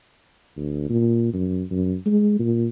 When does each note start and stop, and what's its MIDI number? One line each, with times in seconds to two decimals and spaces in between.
0.56 0.88 38
0.90 1.32 46
1.33 1.63 42
1.71 1.95 42
2.06 2.38 56
2.39 2.67 46